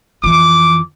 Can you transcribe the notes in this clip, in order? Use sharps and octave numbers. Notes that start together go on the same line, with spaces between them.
F2 E3 D6